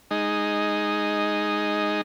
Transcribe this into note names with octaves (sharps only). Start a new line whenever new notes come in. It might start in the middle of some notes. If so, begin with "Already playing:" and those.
G#3 D#4